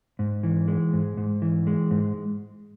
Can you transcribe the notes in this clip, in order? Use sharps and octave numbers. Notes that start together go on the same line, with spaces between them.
G#2
E3
G#3
G#2
G#2
E3
G#3
G#2